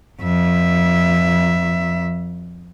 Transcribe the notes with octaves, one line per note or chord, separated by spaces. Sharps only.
F2 E5